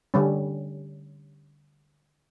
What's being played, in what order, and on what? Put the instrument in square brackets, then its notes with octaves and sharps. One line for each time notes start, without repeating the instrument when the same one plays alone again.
[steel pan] D3 G3 C#4